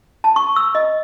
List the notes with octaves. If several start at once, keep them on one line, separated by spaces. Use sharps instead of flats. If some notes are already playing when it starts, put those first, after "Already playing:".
A5
C#6
E6
D#5